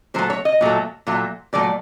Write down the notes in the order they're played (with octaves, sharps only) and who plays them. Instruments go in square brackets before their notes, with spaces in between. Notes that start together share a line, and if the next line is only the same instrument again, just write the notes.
[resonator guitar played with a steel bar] A#2 F#3 A3 C5
C#5
D#5
A#2 F#3 A3
A#2 F#3 A3
A#2 F#3 A3 D5